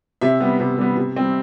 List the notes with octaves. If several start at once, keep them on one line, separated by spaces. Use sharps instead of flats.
C3 E5
G3 B3
C3
G3 B3
C3
G3 C4